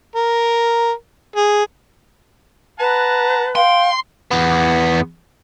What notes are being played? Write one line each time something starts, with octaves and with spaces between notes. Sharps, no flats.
A#4
G#4
B4 F#5 A5 A#5
F5 G5 C6
E2 B3